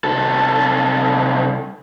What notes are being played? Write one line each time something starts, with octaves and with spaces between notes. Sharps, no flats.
C2 A4